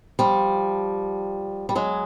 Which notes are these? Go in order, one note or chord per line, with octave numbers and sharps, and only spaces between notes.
F3 G3
G3
F#3 G#3